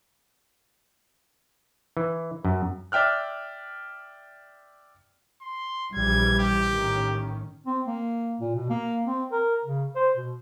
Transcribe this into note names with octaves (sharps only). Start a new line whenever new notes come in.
E3
F#2
D5 E5 G5 F6 F#6
C6
A#1 E3 G3 G#6
G4
A2 D#3 C#4
C4
A#3
A#2
B2
A#3
C4
A#4
C#3
C5
B2